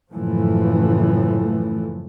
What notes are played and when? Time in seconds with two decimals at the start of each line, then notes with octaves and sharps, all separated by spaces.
0.11 F#1 A2 E3 F3 A3